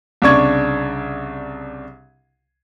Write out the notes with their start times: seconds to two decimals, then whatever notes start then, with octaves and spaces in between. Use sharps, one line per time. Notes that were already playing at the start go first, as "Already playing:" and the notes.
0.22 C2 C#3 D4 C#6 G#6